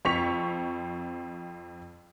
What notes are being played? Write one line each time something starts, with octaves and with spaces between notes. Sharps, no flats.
F2 C4 C#6 B6 F7